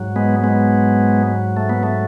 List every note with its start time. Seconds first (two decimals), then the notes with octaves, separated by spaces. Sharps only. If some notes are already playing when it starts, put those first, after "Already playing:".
Already playing: G#2 F#3
0.16 G#3 B3
0.44 G#3 B3
1.57 A3
1.69 B3
1.83 A3